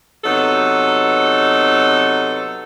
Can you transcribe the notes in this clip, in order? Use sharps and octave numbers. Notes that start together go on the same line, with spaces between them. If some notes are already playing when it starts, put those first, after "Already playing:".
C3 F#3 B3 D#4 A4